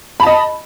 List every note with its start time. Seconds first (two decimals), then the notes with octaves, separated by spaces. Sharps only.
0.20 B5
0.23 A5
0.26 D#5